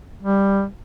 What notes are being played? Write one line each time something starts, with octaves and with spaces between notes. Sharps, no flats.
G3